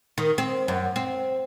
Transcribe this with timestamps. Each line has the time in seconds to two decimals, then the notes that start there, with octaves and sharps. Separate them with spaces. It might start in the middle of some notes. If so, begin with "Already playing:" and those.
0.18 D#3
0.38 C4
0.68 F#2
0.96 C4